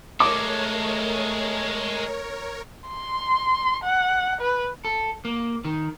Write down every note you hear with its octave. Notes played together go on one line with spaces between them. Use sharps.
G#3 A3 A4 A#4 C#5 D6
C6
F#5
B4
A4
A#3
D#3